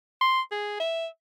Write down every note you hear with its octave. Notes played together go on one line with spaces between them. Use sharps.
C6
G#4
E5